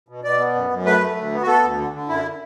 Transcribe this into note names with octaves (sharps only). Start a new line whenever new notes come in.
B2
B2 D5
B3
F#2
F#2
A3 B4
A3
D2
B3
F#4
B3 A4
D2
D3
D3
F#2 E4